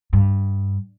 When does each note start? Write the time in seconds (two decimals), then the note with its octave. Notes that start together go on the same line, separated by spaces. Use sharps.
0.13 G2